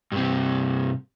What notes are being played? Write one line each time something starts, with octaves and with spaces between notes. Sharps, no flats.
G2 C3